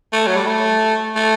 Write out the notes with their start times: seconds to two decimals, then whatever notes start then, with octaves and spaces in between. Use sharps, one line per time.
0.12 A3
0.27 F#3
0.36 G3
0.46 A3
1.16 A3